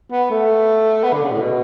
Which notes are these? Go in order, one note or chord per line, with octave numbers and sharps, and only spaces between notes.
B3
A3
B3
D3
C#3
A2
B2